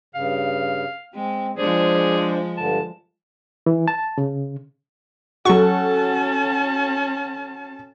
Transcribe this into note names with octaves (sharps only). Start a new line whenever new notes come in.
G2 C#3 F5
G#3 C4
F3 G#3 D4 G#4 C5 D5
G2 D3 A5
E3
A5
C#3
F#3 C#4 F#4 A4 A5 C#6